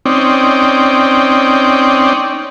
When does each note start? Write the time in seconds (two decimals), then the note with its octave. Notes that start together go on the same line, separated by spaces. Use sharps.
0.06 C4 C#4 D#4 D5 G5